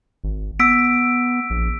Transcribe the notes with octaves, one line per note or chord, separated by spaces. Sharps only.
G#1
B3 E6 B6 D7
A#1